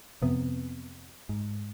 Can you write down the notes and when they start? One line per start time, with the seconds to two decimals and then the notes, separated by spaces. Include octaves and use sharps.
0.22 F2 C3 B3
1.29 G#2